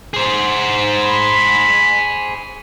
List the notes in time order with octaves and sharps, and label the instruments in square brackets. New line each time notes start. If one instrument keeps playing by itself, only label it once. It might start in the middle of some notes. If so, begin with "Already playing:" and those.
[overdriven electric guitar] G#4 C5
[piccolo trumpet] B5